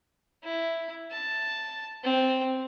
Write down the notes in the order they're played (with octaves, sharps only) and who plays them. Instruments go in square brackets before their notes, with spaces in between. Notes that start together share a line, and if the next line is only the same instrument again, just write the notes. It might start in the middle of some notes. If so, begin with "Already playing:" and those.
[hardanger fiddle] E4
A5
C4